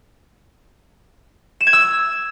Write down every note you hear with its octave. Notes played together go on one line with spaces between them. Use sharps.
E7
G#6
E6